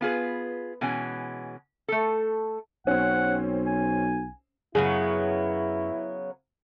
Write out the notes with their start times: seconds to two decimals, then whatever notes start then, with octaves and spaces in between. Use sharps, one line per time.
0.01 B3 F4 G#4 B4
0.81 B2 E3 G#3 C#4 G#5
1.88 A3 A4
2.87 B1 C4 C#4 F#5
3.66 G#5
4.75 F#2 C#3 F#3 B3 E4 G#4